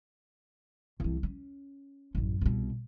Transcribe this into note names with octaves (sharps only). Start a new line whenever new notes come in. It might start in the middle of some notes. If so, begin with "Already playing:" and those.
C2 E3
C#4
A1 F#2
C2 B2